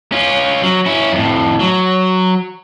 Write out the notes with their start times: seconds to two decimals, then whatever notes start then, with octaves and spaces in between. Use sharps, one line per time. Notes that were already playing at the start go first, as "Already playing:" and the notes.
0.12 C#4 F4
0.63 F#3
0.86 C#4 E4
1.13 F2 A2
1.60 F#3